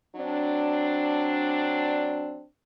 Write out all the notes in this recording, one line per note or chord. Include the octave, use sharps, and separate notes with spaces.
F#3 C4 D4